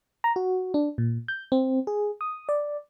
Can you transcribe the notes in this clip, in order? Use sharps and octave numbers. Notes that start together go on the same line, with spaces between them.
A#5
F#4
D4
A#2
G6
C4
G#4
D#6
D5